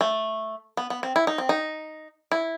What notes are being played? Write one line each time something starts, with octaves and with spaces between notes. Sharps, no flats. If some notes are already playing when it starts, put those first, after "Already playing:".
A3
B3
B3
C4
E4
D#4
C4
D#4
E4